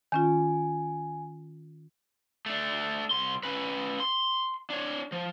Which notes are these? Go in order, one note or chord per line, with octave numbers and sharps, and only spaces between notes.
D#3 C#4 F4 G#5
A3 D4
C2 C6
C#4 B4
C6
D4 C#5
F3